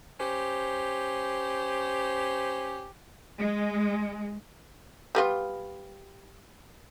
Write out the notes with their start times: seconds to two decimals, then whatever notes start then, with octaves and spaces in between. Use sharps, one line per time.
0.20 C#4 G4 C5
3.39 G#3
5.15 G3 B3 F4